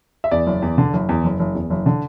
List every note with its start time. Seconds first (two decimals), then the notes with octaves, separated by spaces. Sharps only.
0.24 E5
0.31 E2 D5
0.47 F#1
0.62 E2
0.78 D3
0.93 F#1
1.09 E2
1.24 F#1
1.40 F#1
1.55 E2
1.70 F#1
1.86 D3